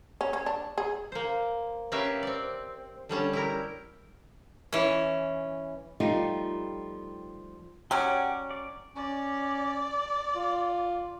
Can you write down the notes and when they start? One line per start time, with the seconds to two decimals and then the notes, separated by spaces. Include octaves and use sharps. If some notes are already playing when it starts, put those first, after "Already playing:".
0.21 C#4
0.33 C#4
0.46 D4
0.78 G#4
1.12 A#3 C5
1.92 C#4 G4 A#4 B4 E5 F5
2.23 C4 D5
3.09 D3 G3 C#4 A5
3.33 E4 G4 A#4
4.73 E3 C#4
6.00 F3 G3 A3 D#4 F4 G4
7.91 F#3 C#4 G4 D5 F#5
8.51 D5
8.96 C#4 D5
10.35 F4